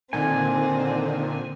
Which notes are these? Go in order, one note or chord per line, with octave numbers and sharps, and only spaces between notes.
A#2 D3 D#3 C4 G#5